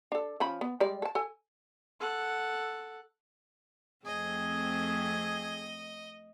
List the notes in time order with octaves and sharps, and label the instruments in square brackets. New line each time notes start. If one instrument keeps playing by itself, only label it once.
[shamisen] D4 A4
F3 C#4 B5
B3
G3 G#3 D5
A4 A5
A4 G#5
[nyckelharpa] A4 F#5
[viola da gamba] F2 A3 C4 [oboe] G#4 [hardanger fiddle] D#5